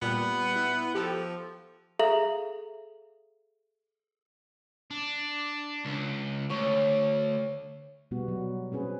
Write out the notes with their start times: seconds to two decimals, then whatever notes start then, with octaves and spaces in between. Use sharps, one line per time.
0.02 A#2 G3 B3
0.56 E4
0.95 F3 G4 A4
1.99 G#4 A4 E5 F5 A#5 F#7
4.91 D4
5.85 C#2
6.50 D2 C#5
8.11 B2 G3 B3 F#4
8.28 F#3
8.72 C4 C#4 G#4 B4